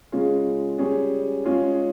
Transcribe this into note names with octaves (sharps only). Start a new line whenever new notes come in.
C#3 G#3 C#4 F4
G3 C#4 G#4
G#3 C#4 F4 G#4